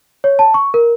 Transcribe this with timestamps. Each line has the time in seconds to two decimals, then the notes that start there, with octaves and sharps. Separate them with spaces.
0.24 C#5
0.39 A5
0.54 C#6
0.74 A#4